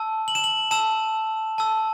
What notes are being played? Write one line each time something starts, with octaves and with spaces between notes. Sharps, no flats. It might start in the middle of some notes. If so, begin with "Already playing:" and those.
Already playing: A5 E6
F#7
E7
F#7
A5 E6 E7
A5 E6